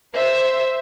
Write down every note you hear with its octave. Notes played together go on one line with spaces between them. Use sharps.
C5 E5